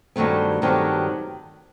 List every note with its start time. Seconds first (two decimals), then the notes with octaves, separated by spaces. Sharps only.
0.16 G2 D#3 F#3 A3 C4
0.62 G2 D#3 F#3 A3 C4